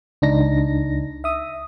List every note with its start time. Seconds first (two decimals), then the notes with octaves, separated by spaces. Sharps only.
0.22 C#2 D4 D#4 A#6
1.24 E5 D#6